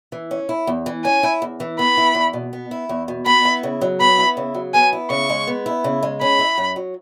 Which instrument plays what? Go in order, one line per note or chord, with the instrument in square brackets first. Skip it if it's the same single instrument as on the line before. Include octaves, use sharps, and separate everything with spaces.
[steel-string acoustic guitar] E3
C#4
E4
E2
E3
[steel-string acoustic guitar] C#4 [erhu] G#5
[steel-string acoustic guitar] E4
E2
E3
[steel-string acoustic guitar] B3 [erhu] B5
[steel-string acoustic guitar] E4
E2
B2
B3
E4
E2
B2
[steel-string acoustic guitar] B3 [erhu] B5
[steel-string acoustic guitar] E4
C#3
F#3
[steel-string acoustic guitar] B3 [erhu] B5
[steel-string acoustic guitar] E4
C#3
F#3
[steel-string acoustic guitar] B3 [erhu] G#5
[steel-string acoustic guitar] E4
[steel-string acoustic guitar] C#3 [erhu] C#6
[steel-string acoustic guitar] G#3
B3
E4
C#3
G#3
[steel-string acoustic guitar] C#4 [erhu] B5
[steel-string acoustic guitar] E4
F#2
F#3